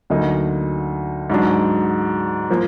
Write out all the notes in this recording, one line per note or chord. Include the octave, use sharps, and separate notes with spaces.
D2 D3 F#3 A#3 D#4
G#2 F#3 D4
F3 A#3